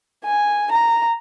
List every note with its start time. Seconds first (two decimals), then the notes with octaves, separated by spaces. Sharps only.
0.25 G#5
0.72 A#5